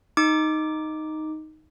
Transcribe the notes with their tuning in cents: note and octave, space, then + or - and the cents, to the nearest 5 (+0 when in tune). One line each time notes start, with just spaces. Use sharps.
D#4 +0 D6 +0